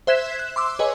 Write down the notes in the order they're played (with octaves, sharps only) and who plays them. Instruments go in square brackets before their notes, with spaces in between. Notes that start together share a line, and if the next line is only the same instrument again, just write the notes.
[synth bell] C5 E5 F#6 G#6 B6 E7
F#6
C6 D6 E6
G#4 B4 C#5 D#5 G#5